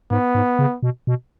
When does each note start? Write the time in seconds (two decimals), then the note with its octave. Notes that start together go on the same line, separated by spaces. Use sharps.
0.11 G#2 B3
0.35 G#2
0.59 C#3
0.83 B2
1.07 B2